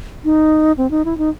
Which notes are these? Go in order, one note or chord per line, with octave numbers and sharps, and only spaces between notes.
D#4
C4
D#4
E4
D#4